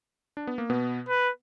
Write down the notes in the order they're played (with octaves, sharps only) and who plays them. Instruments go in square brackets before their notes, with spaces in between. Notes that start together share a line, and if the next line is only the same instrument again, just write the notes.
[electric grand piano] D4
B3
A#3
B2 B3
[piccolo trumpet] B4